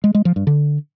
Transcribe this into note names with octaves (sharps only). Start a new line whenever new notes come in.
G#3
G#3
F3
G2
D3